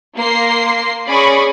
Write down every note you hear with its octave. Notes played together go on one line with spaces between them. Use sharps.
A#3 C6 A#6 C7
C#4 G#4 D5 B5 C#6 A#6